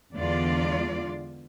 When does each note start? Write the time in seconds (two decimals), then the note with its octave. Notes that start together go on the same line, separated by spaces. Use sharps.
0.17 E2 D3 G#3 F4 D5